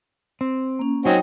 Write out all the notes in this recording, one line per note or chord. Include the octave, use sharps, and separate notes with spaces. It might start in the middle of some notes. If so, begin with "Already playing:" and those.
C4
A#3 C#4
F#3 C4 C#4 D#4 F#4 G5